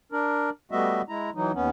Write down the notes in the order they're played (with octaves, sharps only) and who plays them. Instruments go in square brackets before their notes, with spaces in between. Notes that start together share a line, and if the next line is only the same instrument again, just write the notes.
[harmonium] D4 A#4
G3 A3 B3 F#4 D#5 E5
G#3 E4 A#5
E3 F#3 D#4
D#2 B3 C#4